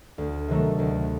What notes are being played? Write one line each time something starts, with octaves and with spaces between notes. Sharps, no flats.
D2
C3 D#3 F#3 A3
D2